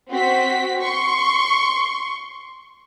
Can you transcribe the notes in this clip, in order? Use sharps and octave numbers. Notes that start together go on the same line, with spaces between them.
C4 F#4 B6
C6 C#6